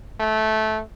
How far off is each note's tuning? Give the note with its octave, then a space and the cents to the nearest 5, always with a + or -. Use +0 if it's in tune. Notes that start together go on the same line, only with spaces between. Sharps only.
A3 -15